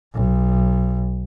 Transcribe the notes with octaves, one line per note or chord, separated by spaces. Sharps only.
B1